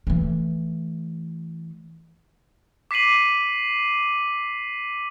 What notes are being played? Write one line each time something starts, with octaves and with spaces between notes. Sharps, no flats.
E3 A3
D6 B6 C7 D#7 F#7